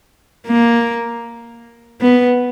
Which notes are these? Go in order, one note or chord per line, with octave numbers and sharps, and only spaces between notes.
A#3
B3